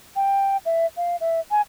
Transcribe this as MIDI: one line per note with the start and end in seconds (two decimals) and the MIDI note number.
0.16 0.57 79
0.66 0.86 76
0.97 1.16 77
1.21 1.40 76
1.51 1.61 80